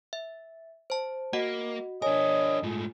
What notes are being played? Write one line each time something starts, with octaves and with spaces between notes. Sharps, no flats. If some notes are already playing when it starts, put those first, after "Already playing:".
E5
C5 A5
A#3 F#4 D#5 F#5
D4 A#4 C#5 D#5 G#5
G#2 A3 F4